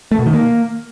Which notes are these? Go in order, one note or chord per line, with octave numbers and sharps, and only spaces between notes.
A3
B2
D#3
A#3